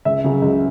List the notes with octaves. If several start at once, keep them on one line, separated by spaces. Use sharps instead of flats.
C#2 E5
C#3 F#3
C#2